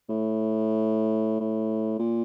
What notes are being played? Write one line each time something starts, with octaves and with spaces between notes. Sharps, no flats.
A2
A2
A#2